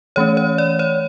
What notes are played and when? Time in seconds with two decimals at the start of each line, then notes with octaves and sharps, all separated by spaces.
0.16 E3 A3 C#4 C#5
0.37 C#5
0.58 D5
0.79 C#5